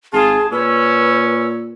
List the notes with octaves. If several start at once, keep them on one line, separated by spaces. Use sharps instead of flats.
G#1 F4 G#4 A5
A#2 C#4 B4 E6